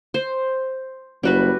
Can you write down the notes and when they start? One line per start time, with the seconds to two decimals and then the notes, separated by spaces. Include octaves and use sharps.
0.14 C5
1.23 F#1 G3 F#4 B4